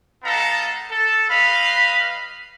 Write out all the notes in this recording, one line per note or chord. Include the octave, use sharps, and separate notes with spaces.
G#3 B3 D#4 A4 F5 A#5
A4
G3 B4 D#5 F5 B5